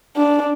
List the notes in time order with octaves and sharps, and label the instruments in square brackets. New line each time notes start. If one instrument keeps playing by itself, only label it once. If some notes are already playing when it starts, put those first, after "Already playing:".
[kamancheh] D4